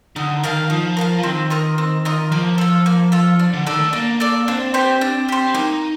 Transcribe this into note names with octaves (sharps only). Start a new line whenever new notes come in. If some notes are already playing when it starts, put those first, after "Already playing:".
D3 D#4
D#3 A#4 F5 A5
F3 D#4
A#4 F5 A5
F3
D#3 C4
F4 A#4 D#5
C4
F4 A#4 D#5
F3 A#3
F4 A4
A#3
F4 A4
D4
D3
D#3 A4 D5
A3
A#3 D4
A4 D5
C4 D4
G4 C5
D4
G4 C5
A#3 D#4